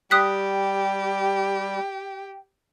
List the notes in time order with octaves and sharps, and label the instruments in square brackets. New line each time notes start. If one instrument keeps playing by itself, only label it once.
[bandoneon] G3 [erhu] G4 [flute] G5 [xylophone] D#6 F#6 B6